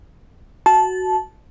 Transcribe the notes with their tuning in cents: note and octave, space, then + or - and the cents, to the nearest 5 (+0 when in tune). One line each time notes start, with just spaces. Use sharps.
F#4 +0 A5 -15